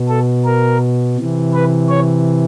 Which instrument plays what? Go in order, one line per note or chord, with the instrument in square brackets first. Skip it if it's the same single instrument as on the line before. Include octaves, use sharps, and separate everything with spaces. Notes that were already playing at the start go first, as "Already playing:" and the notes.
Already playing: [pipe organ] B2
A4
A#4
C3 E3
B4
C#5